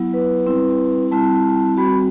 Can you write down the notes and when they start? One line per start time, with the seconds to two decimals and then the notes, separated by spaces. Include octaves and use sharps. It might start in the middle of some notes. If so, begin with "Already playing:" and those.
Already playing: F#3 B3 E4
0.14 B4
0.47 G3 C4 E4
1.11 G3 C4 E4 A5
1.77 G3 C4 F#4 B5